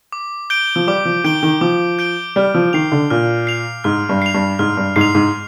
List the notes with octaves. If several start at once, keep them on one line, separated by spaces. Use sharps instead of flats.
D6
G6 D7 G7
F3
G3 D6
F3
D#3 G6 D7 G7
D#3
F3 D6
G6 D7 G7
G3 F6
F3
D#3 C7 F7
D3
A#2 F6
C7 F7
G#2 F6
G2
C7 F7
G2
G#2 F6
G2
G#2 C7
F7
G#2